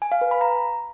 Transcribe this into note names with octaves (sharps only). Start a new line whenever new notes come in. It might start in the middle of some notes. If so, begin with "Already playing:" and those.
G#5
F5
B4
B5
A#5